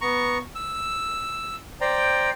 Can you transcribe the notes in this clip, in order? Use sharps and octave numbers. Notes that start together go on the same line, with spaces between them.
B3 A#5 C#6
E6
C5 D5 G5 A#5